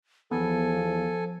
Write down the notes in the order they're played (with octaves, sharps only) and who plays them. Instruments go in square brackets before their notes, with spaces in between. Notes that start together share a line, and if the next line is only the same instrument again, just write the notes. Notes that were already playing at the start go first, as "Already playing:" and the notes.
[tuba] E2 [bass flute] F3 [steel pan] B3 [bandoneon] A4 G#5